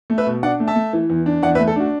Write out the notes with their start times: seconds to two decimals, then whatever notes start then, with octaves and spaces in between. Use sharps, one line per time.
0.10 A3
0.18 B4 E5
0.26 B2
0.43 D4 D5 F#5
0.60 A3
0.68 E5 A5
0.76 A3
0.93 E3
1.10 E2
1.26 D4
1.43 E2 D5 F#5
1.55 B4 E5
1.59 A3
1.68 A4
1.76 D4 F#4